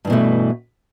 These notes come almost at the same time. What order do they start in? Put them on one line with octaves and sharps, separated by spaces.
G2 E3 B2 A3